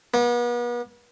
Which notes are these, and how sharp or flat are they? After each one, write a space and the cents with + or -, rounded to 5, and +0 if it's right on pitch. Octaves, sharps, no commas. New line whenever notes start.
B3 -40